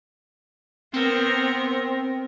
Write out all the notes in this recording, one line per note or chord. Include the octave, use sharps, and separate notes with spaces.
B3 C4 A#4